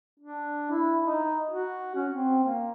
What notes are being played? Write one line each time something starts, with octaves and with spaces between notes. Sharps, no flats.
D4
E4
D#4
F#4
C#4
C4
A#3